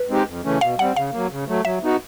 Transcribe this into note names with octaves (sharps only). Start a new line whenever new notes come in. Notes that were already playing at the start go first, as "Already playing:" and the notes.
Already playing: B4
G#3 C4 D#4 G4
F2
C#3 E3 A3 C#4
B2 F5
G3 C4 F#5
C#3 F5
F#3 A#3
C#3
F#3 A3
F#3 E5
B3 D#4 F#4